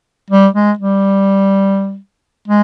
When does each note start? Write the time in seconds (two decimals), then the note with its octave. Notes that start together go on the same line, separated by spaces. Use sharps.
0.30 G3
0.54 G#3
0.79 G3
2.48 G#3